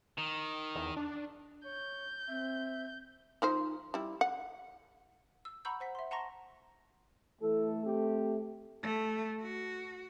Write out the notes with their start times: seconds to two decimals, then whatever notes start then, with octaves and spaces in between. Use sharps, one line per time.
0.18 D#3
0.75 E2
0.97 D4
1.65 C#5 G6
2.28 C4 E5
3.42 F3 D#4 C5
3.94 G3 E4
4.21 F#5
5.45 E6
5.65 F#5 A#5 B5 C#6 E6 G6
5.80 C5 F#5 B6
5.95 E5 C6
6.11 F#5 A5 A#5 C6 C#6 A#6
7.41 E3 A3 A4
7.85 C4 G4
8.83 A3
9.42 F#4